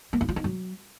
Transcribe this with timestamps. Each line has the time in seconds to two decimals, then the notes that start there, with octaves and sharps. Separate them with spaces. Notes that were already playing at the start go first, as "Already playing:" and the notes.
0.13 A#3
0.21 E4
0.29 F4
0.36 D#4
0.44 F#3